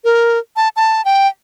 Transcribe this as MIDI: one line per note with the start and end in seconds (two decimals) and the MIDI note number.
0.04 0.38 70
0.56 0.69 81
0.76 1.04 81
1.05 1.28 79